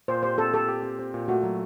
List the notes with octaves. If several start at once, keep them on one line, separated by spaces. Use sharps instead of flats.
A#2 C5
G4 C5
C4 A4
G4 A4
G4
C4
C4
A#2
A3 F#4
F#3